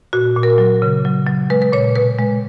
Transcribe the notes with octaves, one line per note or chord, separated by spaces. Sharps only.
A#2 F#4
A#2
A#4
F#3
C#3
F#3
F#3
G#3 B4
B4
A#2 C#5
B2 B4
G#3